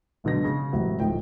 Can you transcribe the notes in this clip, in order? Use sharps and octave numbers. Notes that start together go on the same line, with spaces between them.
G#1 B2 D3 F#3 A#6
C#3
E1 A1 C3 F#3 C4 F#4
D1 G#2 F3 G5